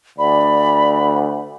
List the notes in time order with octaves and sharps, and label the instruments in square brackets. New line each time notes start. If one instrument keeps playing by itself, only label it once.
[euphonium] D2 [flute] D5 [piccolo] B5